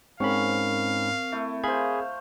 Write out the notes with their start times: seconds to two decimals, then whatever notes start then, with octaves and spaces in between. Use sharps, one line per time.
0.20 G#2 C4 C#4 A#4 F5 B5 C#6
1.32 A3 E4
1.64 G#4 C5 F5 B5 G#6